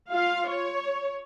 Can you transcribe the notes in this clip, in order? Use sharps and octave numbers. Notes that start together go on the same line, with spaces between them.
F4 F5
C#5